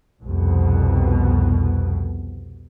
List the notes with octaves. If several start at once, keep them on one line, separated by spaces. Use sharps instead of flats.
C2 F2 B2